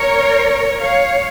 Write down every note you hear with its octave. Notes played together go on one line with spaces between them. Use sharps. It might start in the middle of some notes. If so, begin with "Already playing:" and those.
Already playing: A#4 C#5
C#5 F5